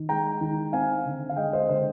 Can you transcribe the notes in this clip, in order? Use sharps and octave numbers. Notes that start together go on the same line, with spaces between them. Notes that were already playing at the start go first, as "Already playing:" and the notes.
Already playing: D#3
G#3 G5 A#5
D#3
C4 F5 G#5
D3
F5
G#3 D#5 G5
C5 D#5
D3 C5